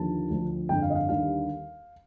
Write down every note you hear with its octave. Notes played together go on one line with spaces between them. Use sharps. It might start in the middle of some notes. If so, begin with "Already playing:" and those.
Already playing: D#2 D3 F3 A5
D2 D3 F3
G1 F2 D3 G5
F5
D#5
F5
D#2 D3 G3 F5